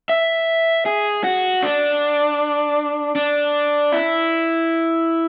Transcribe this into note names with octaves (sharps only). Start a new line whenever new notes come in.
E5
G#4
F#4
D4
D4
E4